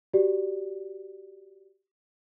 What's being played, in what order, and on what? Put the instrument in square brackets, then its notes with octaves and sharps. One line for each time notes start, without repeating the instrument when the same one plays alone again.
[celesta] F#4 G4 D5